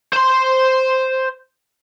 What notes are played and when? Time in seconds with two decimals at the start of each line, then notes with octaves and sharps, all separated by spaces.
0.13 C5 C6